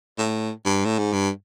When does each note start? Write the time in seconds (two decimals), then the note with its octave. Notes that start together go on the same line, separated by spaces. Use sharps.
0.18 A2
0.65 G2
0.85 A2
0.99 G#2
1.13 G2